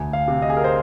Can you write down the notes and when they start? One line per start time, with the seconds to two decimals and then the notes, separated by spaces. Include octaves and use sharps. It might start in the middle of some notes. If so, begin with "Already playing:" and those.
Already playing: D2 G#5
0.13 F5
0.28 C3
0.42 D#5
0.50 G#4
0.57 A#4
0.64 C5